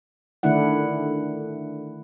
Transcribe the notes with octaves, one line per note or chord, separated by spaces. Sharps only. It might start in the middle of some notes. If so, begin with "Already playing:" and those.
D3 D#3 A3 D4 E4 F#5